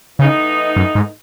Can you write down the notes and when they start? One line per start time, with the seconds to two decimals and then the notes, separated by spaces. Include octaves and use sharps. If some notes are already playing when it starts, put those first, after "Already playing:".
0.19 A2 C#3 E3 B3 D#4
0.76 F#2
0.95 G#2